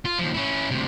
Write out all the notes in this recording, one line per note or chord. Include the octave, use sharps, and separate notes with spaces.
F4
D#2 F3
C#4 E4
D2 C3